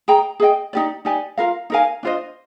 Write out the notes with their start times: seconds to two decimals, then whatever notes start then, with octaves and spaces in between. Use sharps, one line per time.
0.08 G#4 D#5 G5 A#5
0.40 G#4 D#5 G5
0.73 D#4 G4 D5
1.05 D#4 G4 D5 G#5
1.38 F4 A#4 F5
1.70 D#4 A#4 F5 G#5
2.03 D4 F4 C5 D#5